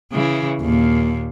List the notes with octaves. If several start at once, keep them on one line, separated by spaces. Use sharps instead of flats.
C#3 E3
D#2 A#2